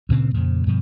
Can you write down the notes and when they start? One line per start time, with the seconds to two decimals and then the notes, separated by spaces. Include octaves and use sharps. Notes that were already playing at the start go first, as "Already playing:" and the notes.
0.09 D2 A#2 C#3 C4
0.34 F2 A#2 C#3
0.66 G2 B2 F3